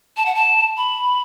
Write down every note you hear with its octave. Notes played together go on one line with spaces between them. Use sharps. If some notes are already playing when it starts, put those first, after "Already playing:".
A5
F#5
A5
B5